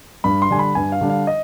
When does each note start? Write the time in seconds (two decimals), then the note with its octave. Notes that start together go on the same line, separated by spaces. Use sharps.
0.24 G2 B5
0.42 C6
0.50 D3 G3 D4 G#5
0.59 B5
0.75 G2 G#5
0.92 F5
1.01 D3 G3 D4
1.10 F5
1.27 D#5